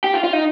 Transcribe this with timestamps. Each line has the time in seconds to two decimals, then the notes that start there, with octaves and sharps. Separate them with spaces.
0.04 G4
0.14 F4
0.24 F4
0.33 D#4